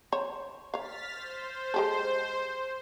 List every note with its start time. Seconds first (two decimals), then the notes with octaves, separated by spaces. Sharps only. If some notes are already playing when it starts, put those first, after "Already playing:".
0.12 C5 C#5
0.74 C#5 F5 F6 A6 B6
1.12 C5
1.74 G#3 G4 A4